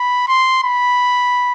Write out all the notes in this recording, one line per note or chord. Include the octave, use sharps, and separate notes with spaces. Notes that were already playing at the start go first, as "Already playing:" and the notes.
Already playing: B5
C6
B5